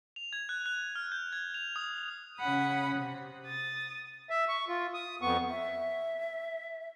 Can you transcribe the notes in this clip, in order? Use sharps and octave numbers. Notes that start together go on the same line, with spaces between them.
F7
G#6
F#6
F#6
F6
G6
G#6
F7
D#6
C#3 C#4 F#5 B5 D#6
C3
D#6 A6
E5
C#6
F4
D#6
F2 B3 C#6
E5